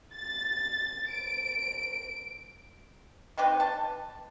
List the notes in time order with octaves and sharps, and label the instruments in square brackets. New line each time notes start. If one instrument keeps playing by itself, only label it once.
[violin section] A6
D7
[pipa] D#3 C4 G4 B4
A5